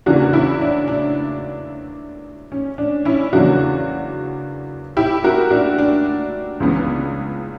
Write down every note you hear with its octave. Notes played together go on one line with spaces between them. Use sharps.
E2 C#3 E3 A#3 D4 F#4
C#4 E4
D4
D4
C#4
D4
C#4 E4
E2 C#3 F#3 A#3 D4 F#4
E4 G4
F#4 A#4
D4 F#4
D4
C#2 C#3 E3 B3